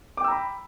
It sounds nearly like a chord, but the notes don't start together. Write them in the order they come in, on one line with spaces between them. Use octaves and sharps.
D6 G5 E6 A#5 B5